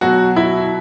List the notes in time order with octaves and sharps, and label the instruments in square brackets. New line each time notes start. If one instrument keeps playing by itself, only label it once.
[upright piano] B2 F#3 F#4
E4